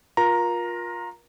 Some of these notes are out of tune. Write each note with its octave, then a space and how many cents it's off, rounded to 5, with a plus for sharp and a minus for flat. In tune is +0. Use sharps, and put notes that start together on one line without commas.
F4 +20 A#4 +30 A#5 +0